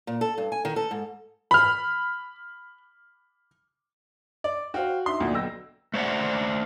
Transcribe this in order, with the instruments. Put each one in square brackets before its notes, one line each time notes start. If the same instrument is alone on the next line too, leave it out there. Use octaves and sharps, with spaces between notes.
[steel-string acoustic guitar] A#2
A4
G2
G#5
D#3
A4
G#2
[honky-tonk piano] B5 F6
[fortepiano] D5
[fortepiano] F#4 [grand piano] C5 F5 G5
[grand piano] D4 D#4 E5 [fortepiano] C6
[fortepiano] D2 A#2
[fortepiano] B1 [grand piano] G5 E6 A#6
[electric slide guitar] A3 C5 D5 F#5